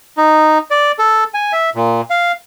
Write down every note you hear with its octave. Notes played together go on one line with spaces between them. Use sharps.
D#4
D5
A4
G#5
E5
A#2
F5